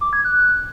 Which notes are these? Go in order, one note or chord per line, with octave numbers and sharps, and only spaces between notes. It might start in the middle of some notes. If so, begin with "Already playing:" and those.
D6
G#6
F#6